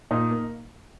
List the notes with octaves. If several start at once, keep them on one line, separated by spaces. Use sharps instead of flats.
A#2 D#4
A#3